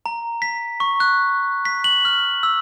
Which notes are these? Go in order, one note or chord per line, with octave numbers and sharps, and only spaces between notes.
A#5
B6
C#6
F#6
B6
F#7
F6
E6